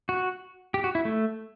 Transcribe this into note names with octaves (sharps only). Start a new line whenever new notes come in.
F#4
G4
F#4
E4
A3